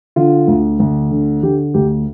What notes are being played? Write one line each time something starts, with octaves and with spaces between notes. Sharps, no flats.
D3 F4
D2
D2
D3
D3 G4
D2 G4